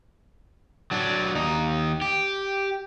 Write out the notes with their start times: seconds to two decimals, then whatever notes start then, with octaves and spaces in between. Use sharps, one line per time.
0.91 F#3 D4
1.35 D#2 D#4
2.02 G4